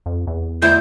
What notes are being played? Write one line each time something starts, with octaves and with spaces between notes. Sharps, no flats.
F2
E2
D2 E4 G6